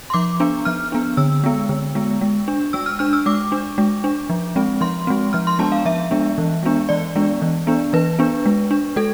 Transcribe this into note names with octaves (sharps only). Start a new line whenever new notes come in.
C6
F3 D6
B3 D4
F3 F6
B3 D4
D3 E6
G#3 B3
D3
G#3 B3
G#3
D4
G#3 E6
F6
D4 F6
E6
G#3 D6
D4
G#3
D4
F3
G#3 C4
F3 C6
G#3 C4
F3 F6
C6
G#3 B3 D4 A5
F5
F3 E5
G#3 B3 D4
E3
G#3 B3 D4
E3 D5
G#3 B3 D4
E3
B3 D4
E3 B4
B3 D4
G#3
D4
G#3 A4